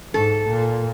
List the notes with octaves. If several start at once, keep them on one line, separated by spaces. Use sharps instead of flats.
G#2 A4
A#2